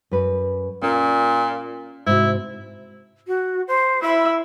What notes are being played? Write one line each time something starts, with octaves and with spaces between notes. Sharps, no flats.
F#2 B4
A#2 C#4
G#2 C3 E4 F#4
F#4
C5
E4 E5 B5